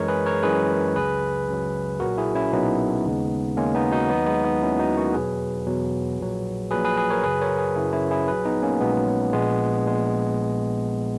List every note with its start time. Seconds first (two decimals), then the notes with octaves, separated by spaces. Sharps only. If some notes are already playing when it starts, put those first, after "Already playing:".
Already playing: F#2 E3 G#3 A#4 C#5
0.08 G#4 B4
0.26 A#4 C#5
0.43 F#2 E3 G#3 G#4 B4
0.96 C#2 C#3 F#3 G#4 B4
1.48 C#2 C#3 F#3
2.00 B1 A#2 F#3 F#4 A#4
2.18 E4 G#4
2.35 C#4 E4
2.52 B1 A#2 F#3 B3 D#4
3.06 D#2 C#3 G#3
3.57 D#2 C#3 G#3 A#3 C#4
3.75 B3 D#4
3.92 D#4 F#4
4.09 D#2 D#3 F#3 B3 D#4
4.26 G#3 B3
4.44 B3 D#4
4.62 D#2 D#3 F#3 C#4 E4
4.79 D#4 F#4
4.97 F#4 A#4
5.14 E2 B2 F#3 G#4 B4
5.67 E2 B2 F#3
6.19 A#1 A#2 F#3
6.71 A#1 A#2 F#3 G#4 B4
6.85 G#4 B4
6.97 G#4 B4
7.10 A#4 C#5
7.23 F#2 C#3 F#3 G#4 B4
7.41 A#4 C#5
7.58 G#4 B4
7.76 F#2 C#3 F#3 E4 G#4
7.93 C#4 E4
8.11 E4 G#4
8.28 A#1 A#2 F#3 G#4 B4
8.45 B3 D#4
8.63 A#3 C#4
8.80 A#1 A#2 F#3 G#3 B3
9.33 A#1 A#2 G#3 B3
9.85 A#1 A#2 G#3